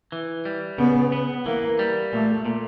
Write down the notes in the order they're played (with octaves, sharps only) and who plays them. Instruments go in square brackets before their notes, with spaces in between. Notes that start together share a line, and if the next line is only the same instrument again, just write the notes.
[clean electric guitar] E3
G3
[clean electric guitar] C#3 [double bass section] B3
[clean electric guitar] B3
[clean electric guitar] E3 [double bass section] A#3
[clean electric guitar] G3
[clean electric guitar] A#2 [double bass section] A3
[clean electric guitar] A#2